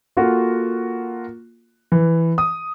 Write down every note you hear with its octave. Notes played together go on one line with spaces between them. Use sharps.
A#3 F4 F#4 A4
E3
D#6